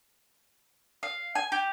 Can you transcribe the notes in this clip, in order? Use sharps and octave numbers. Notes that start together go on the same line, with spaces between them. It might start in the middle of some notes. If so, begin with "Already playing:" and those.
F5
G#5
G4